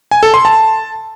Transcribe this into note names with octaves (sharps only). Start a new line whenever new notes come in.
G#5
A4
C6
A5